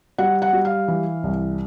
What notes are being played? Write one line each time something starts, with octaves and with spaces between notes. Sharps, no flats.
G3 F#5
F#5
G3
F5
E3
C2